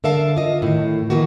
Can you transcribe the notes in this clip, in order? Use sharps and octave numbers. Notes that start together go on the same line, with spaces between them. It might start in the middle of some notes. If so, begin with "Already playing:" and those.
D3 A#4 E5 F5 A5
F4 D#5
A2 D#3
D#3 E3 A#3 F4 F#4